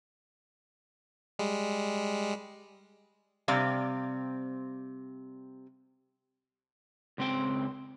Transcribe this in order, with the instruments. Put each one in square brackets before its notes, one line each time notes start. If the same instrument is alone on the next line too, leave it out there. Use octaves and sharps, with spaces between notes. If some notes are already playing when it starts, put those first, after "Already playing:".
[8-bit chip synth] G3 G#3
[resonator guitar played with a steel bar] C3 G3 C4 D5 F5
[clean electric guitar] C#2 C4 G5